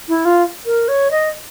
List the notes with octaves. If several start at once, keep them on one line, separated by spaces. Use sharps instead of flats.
E4
F4
A#4
C#5
D#5